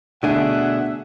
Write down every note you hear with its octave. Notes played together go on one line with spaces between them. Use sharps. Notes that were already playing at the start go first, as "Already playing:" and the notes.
B2 D3 A3 D4 G#4 E5 F#5 D#7